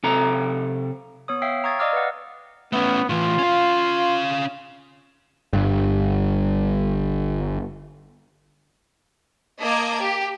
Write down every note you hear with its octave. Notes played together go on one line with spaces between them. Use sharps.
C3 A4 A#5
B3 C#5 D#6
C#5 E5 F5 G5 E6 C7
A#5 C#6 D#6 G#6 A6
D5 D#5 F5 D6 E6 F6
B4 F#5
A3 B3 C#4
A2 E3 F4
C#4 F5
G1 G2
A#3 D#5 A5 D6 G#6
G4